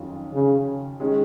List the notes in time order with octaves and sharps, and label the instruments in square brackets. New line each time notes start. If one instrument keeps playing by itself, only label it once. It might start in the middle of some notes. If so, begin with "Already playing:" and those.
Already playing: [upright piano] F2 D#3 F#3 C#4 F4
[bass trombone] C#3
[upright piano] D#3 G#3 C#4